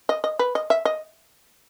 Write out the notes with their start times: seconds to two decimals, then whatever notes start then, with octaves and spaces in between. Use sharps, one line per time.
0.09 D#5
0.24 D#5
0.39 B4
0.55 D#5
0.70 E5
0.85 D#5